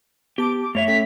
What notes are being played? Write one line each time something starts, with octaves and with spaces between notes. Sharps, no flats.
B3 G4 A5 D6
D6
F#2 A3 C#5 E5 F7
C#4 A4 G5 B6